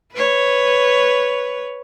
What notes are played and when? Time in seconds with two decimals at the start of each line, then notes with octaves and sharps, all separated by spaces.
0.13 B4 C#5